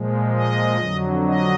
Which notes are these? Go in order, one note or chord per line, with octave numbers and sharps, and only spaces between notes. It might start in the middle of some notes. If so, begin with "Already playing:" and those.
Already playing: A#2 F3 G#3
D#5
F2 D3 F#3
D#5